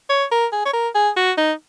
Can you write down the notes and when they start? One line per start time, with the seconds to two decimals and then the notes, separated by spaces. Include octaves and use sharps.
0.10 C#5
0.32 A#4
0.52 G#4
0.66 C#5
0.74 A#4
0.95 G#4
1.17 F#4
1.38 D#4